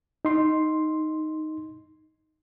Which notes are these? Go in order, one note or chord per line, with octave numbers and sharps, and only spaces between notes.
D#4 C6